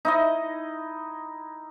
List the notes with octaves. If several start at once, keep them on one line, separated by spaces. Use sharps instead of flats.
D#4 E4 D#5